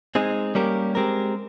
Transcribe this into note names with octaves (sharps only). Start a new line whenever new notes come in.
G#3 C4 D#4 G#4
G3 A#3 C#4 G4 A#4
G#3 C4 G4 A#4